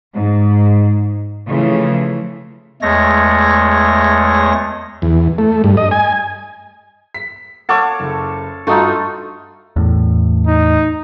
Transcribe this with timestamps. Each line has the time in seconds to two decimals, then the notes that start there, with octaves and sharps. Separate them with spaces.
0.13 G#2
1.49 C#3 E3 F3 A3
2.82 E2 G#3 A3 C#5 A#6
5.02 E2
5.38 A3
5.64 G2
5.77 D#5
5.91 G#5
7.14 B6
7.69 A4 C#5 F5 F#5 C#6 D6
8.00 F#1
8.67 G2 A3 D#4 F4 F#4 A4
9.76 E2 A2
10.47 D#4